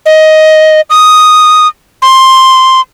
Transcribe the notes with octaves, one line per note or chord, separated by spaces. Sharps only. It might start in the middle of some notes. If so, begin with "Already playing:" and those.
D#5
D#6
C6